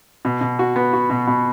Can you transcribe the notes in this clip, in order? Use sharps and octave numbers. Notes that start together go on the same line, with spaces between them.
B2
B2
F#4
B3
F#4
B2
B2